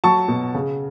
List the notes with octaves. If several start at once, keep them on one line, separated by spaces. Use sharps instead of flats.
F#3 A5 C#6
B2
C#3